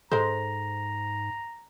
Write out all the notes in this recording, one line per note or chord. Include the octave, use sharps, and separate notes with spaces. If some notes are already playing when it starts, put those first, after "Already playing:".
G#2 G#3 A4 C5 A#5